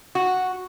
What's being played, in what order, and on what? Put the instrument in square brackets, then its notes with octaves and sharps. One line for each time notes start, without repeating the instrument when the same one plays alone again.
[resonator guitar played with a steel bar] F#4